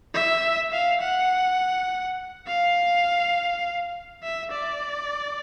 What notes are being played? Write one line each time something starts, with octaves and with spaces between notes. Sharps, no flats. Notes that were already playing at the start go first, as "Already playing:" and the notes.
E5
F5
F#5
F5
E5
D5